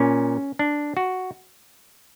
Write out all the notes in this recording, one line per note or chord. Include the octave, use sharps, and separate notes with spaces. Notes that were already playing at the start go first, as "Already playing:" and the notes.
Already playing: A#2 C#4
D4
F#4